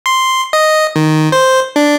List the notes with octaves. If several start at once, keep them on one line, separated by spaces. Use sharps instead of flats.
C6
D#5
D#3
C5
D4